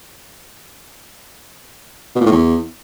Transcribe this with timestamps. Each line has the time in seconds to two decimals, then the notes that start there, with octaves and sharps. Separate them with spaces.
2.15 B2
2.21 A#2
2.26 A2
2.32 E2